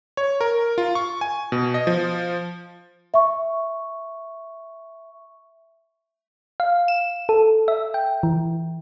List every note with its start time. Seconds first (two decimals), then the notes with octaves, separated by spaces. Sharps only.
0.17 C#5
0.41 A#4
0.78 F4
0.95 C#6
1.21 G#5
1.52 B2
1.74 D#5
1.87 F3
3.14 E5 C#6
6.60 F5
6.88 E7
7.29 A4
7.68 E5
7.94 G5
8.23 E3